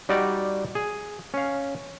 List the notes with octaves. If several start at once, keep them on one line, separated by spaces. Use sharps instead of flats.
G3 D#4 F#4 D5
G#4
C#4 F5